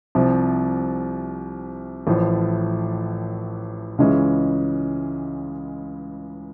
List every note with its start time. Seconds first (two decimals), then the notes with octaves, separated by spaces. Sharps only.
0.15 C2 C3 F3
2.07 A1 A2 F3
3.98 C#2 C#3 E3 G#3 C#4